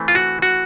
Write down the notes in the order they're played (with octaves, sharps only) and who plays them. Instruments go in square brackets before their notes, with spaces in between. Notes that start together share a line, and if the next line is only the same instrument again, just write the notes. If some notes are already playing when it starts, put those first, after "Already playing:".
Already playing: [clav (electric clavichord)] E3 A3 C4
F4
F#4
F#4